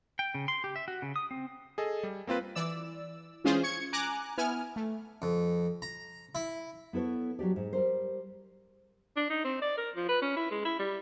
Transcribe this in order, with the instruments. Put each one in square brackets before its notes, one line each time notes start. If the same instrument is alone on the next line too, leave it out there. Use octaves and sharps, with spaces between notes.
[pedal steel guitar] G5
C#3
C6
G4
E5
F#4
C#3
D#6
C4
[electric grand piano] G#4 A4 D#5
G3
A#3 C4 F4 B4
[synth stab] E3 D5 E6
E3 G#3 C#4 F4 G#4 C5
C#6 G#6 C#7
G#5 A#5 D6 F#6
B3 E4 G#5 F6
A3
[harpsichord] F2
A#5
E4
[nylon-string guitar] B3 E4 A4 B4 C#5
F#3 D4 G4 D5
G#2
G3 A#4 C5
[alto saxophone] D4
D#4
C4
D5
A#4
F3
B4
C#4
E4
G#3
E4
G3